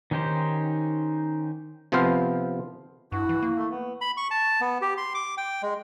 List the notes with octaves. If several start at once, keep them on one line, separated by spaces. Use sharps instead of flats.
D#3 C#4 D#4 G4 C5
C3 F3 B3 C4 C5 F5
G2 E4 F#4
E3
A#3
A3
B3
B5
C#6
A5
B3
G4
C6
D6
G5
G#3